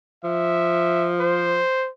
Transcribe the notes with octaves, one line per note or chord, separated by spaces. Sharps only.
F3 E5
C5